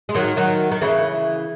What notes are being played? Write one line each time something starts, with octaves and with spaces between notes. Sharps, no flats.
G#3
D#3 F#3
D#3 F#3
D#3
C#3 E3